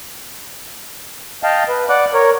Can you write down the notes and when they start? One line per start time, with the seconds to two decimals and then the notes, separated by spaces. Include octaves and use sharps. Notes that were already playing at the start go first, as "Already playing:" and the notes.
1.43 D#5 F5 G5 A5
1.68 B4
1.89 D5 F#5 D6 F#6
2.14 A#4 C#5